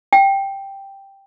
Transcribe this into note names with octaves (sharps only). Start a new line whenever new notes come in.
G5